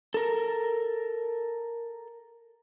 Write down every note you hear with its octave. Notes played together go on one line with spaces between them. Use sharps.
A4 A#4